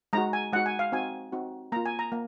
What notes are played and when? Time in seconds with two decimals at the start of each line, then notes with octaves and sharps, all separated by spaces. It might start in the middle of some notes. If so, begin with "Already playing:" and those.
0.13 G#3 D#4 F#4 A#5
0.33 G#5
0.53 G#3 D#4 F#4 F#5
0.66 G#5
0.79 F5
0.92 C4 D#4 F#4 G#5
1.32 C4 D#4 F#4
1.72 A#3 F4 A#5
1.86 G#5
1.99 A#5
2.12 A#3